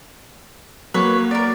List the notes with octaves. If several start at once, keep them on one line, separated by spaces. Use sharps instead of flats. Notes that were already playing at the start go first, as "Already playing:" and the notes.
F#3 A#3 B4 C#5
A#4 D5